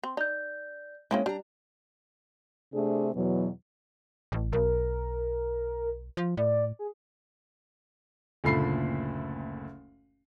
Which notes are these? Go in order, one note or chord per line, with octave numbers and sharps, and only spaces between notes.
C4
D#4 D5 G6
G#3 A#3 C4 C#4 E4
G3 D4 A#5
C3 A3 C4 D4 G#4
E2 B2 F#3
A1
B1 A#4
F3
A2 D5
G#4
F#1 D2 A#2 A3 B5 C7